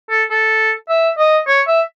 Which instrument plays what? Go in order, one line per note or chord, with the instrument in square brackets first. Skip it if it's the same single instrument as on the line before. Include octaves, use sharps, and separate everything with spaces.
[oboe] A4
A4
E5
D#5
C#5
E5